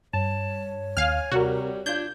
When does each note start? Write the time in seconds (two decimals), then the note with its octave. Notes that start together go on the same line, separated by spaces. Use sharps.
0.14 G2 C#5 A5
0.97 D#2 F5 G#5 F6
1.31 C3 G3 F#4 A#4
1.86 D4 F4 G6 G#6